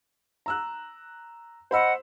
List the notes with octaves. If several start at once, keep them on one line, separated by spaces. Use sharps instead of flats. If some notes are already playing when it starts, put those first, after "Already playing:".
A#5 E6 F#6
C5 D#5 F#5 B5 E6